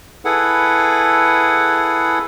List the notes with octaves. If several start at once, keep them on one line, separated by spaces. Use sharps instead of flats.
E4 G#4 A4 B4 F#5